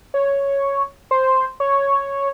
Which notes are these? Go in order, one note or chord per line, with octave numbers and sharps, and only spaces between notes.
C#5
C5
C#5